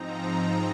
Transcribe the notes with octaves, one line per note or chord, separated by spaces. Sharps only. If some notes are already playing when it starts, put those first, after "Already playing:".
Already playing: G#2 F3 C4 D#4 A#5